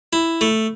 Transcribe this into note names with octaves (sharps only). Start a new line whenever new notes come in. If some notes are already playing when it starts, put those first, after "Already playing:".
E4
A3